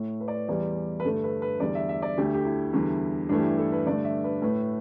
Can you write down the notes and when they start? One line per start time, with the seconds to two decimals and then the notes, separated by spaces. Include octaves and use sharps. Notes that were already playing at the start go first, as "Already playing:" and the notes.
Already playing: A2 A3
0.20 B4
0.28 D5
0.34 B4
0.49 E2 E3 G3 D5
1.00 B4
1.04 G2 D3 A3 A4
1.24 B4
1.42 B4
1.60 E2 D3 G3 D5
1.75 E5
1.89 E5
2.02 D5
2.17 D2 D3 A3 G4
2.34 G4
2.45 E4
2.73 E2 D3 G3
3.29 G2 E3 A3 D4
3.39 G4
3.44 E4
3.58 A4
3.72 B4
3.86 G2 D3 A3 D5
4.04 E5
4.24 B4
4.42 A2 A3 B4